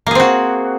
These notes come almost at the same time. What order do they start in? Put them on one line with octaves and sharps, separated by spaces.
A#3 G#4 C4 F#4